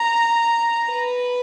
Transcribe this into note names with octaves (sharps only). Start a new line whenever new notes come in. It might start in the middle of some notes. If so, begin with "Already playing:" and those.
Already playing: A#5
B4